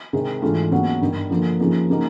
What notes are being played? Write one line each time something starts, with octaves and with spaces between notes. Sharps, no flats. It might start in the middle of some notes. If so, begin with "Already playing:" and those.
C3 D#3 G#3 C4
G#2 E3 A3 D4 F4
D#2 C#3 F#3 B3 D4
G2 D#3 G3
D3 F3 A#3
C#3 F3 A#3 D#4
C#3 F#3 A#3 D#4